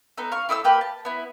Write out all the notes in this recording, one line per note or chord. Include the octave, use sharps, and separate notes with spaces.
B3 D#4 A4
F5 C#6
E4 A4 D#6 E6
A#3 G4 B4
A5
B3 E4